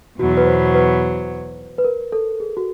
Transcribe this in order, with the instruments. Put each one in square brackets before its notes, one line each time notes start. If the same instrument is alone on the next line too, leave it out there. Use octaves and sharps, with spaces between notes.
[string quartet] E2 B2 F#3 [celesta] F#4
[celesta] B4
C5
B4
B4
A#4
A4
G#4
F#4